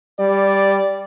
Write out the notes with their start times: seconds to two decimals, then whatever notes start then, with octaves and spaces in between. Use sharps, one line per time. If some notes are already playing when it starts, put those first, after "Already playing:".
0.20 G3 D5